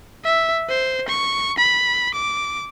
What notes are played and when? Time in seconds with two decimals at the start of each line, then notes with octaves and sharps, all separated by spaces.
0.24 E5
0.69 C5
1.08 C#6
1.58 B5
2.14 D6